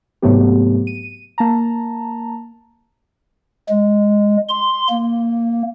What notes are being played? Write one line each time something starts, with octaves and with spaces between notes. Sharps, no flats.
G#2 C3 F#3 A3 B3 G4
D#7
A#3 A5 A#5
G#3
C6
A#3